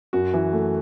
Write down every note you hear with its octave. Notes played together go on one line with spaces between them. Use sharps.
F#2 F#4
E3
A3